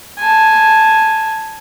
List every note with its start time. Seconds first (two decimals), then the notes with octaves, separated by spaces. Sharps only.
0.19 G#5 A5